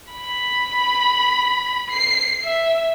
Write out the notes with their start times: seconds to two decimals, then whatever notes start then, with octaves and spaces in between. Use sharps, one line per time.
0.12 B5
1.90 C7
2.44 E5